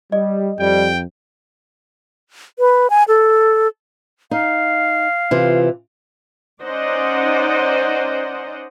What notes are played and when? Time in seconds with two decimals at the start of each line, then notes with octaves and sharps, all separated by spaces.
0.12 G3 D#5
0.59 F2 G3 G5
2.59 B4
2.90 G#5
3.08 A4
4.31 D#4 F5
5.31 C3 E3 F4
6.63 C#4 D#4 C5 D5 D#5 F#5